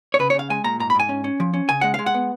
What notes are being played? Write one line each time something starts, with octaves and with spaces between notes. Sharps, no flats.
C#5
C#3 B4
C#5
C#3 F5
G#3 G#5
A#2 A#5
G#2 A#5
B5
G#2 G#5
C#4
C#4
F3
C#4
C#3 G#5
G#3 F#5
G#3 F5
F#5
B3